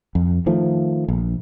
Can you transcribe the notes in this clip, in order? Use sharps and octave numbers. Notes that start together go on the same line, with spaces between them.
F2
D#3 F3 A3
A#1